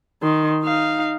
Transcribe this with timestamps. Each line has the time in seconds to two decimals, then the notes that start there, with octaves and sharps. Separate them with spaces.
0.23 D#3 C6
0.63 D#4 F5